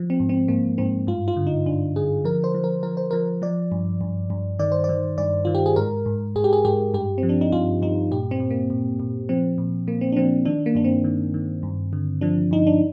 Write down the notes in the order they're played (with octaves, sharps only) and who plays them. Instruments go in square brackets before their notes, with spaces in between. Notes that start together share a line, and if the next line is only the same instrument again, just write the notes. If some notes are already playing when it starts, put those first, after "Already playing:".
Already playing: [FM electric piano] F3
C4
G#2
C4
G#2 A#3
G#2 C4
G2 F4
F4
D3
D#4
G2 D4
D3 G#4
F3 A#4
C5
F3
A#4
F3 A#4
C5
F3 A#4
F3 D5
G2
G2
G2
D#3 D5
C5
D5
D#3
G2 D5
D#3 F4
G4
G#4
G#2 A#4
G#2
G#2 G#4
G4
G#4
G#2 G4
G2 G4
C4
F3
D4
D#4
G2 F4
G2 D#4
A#2 G4
C4
A#2
A#3
A#2
A#2
F3 C4
A#2
A#2 A#3
C4
D4
F3 C4
D#3 D4
A#3
G2 D4
C4
D#3
D#3
G2
D3
F3 D4
G2 D#4
D4